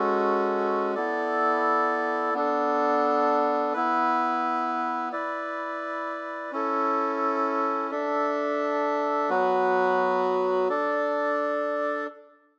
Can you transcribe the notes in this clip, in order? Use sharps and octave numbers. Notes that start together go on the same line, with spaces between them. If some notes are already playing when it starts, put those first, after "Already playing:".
Already playing: G#3 C#4 F#4 A4
B3 E4 A4 D5
B3 D4 A4
B3 E4 B4
E4 B4 D5
C#4 E4 A4
D4 A4 E5
F#3 B3 F#4 B4
D4 A4 D5